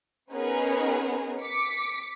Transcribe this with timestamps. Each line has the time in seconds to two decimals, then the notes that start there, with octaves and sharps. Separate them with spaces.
0.32 B3 C#4 D#4 G#4 A#4 B4
1.42 D6 B6 C#7